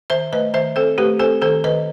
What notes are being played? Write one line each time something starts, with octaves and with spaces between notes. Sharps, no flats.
D#3 C5 E5
A3 B4 D#5
D#3 C5 E5
C4 A4 C5
A3 G4 B4
C4 A4 C5
D#3 A4 C5
D#3 B4 D#5